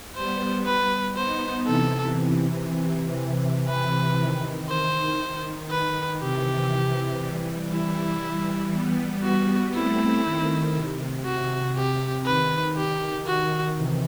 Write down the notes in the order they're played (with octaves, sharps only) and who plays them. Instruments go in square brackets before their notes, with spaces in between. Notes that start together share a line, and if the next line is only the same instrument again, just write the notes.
[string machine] G3 B3 [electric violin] C5
[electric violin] B4
[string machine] B3 D#4 [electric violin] C5
[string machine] C3 E3 [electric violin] A4
[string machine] C3 E3
[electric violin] B4
[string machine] D#3
[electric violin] C5
B4
[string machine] C3 E3 [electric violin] G4
[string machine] E3 G3
[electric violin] E4
[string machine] G3 B3
[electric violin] F#4
[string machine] A3 C4 [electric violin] E4
[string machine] D#3
C3
[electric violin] F#4
G4
[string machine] D#3 [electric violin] B4
[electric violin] G4
F#4
[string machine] C3 E3